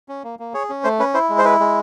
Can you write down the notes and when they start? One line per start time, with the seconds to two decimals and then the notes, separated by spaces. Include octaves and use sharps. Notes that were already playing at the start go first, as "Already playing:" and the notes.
0.08 C#4
0.24 A#3
0.39 A#3
0.54 G#4 C#5
0.69 C#4
0.84 A3 C5
0.99 C#4 B4
1.14 E4 C5
1.30 G#3
1.38 C5
1.44 E4 B4
1.60 G#3